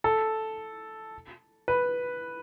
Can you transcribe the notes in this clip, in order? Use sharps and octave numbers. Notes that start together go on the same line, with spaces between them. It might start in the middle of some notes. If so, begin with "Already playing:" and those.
A4
B4